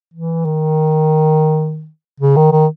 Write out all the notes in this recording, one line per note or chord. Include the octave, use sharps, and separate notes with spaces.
E3
D#3
C#3
D#3
D#3